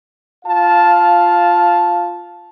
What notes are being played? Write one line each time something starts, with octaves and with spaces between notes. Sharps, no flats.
F4 F5 A5